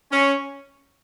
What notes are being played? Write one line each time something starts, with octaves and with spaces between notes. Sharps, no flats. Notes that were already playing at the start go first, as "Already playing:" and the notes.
C#4